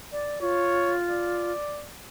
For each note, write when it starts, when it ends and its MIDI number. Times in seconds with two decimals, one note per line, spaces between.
0.12 0.39 74
0.41 1.52 65
0.41 0.95 73
1.10 1.87 74